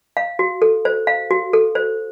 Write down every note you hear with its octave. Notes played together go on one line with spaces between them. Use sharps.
F5
F#4
A4
C5
F5
F#4
A4
C5